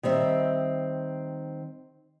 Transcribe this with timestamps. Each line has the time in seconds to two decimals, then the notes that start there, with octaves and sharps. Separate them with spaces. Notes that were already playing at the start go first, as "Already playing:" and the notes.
0.03 D#3 G3 C4 E5